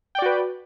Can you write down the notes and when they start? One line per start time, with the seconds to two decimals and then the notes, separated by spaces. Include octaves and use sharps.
0.15 G5
0.19 D5
0.22 F#4
0.26 B4